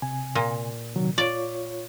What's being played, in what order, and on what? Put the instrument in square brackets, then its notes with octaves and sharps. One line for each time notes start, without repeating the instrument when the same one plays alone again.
[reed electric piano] C3 G#5
[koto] A#2
[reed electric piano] C3 D#3 F#3
[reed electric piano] F4 C#5 [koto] D5